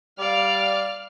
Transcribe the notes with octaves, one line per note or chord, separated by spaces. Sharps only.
G3 D5 F5 F6